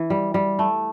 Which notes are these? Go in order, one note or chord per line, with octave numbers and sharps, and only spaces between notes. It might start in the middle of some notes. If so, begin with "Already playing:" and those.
Already playing: E3
G3
G3
A3